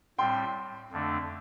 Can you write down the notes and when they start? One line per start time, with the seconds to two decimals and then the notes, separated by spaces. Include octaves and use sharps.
0.18 A2 G3 C4 G5 C6
0.92 F2 D3 A3 D4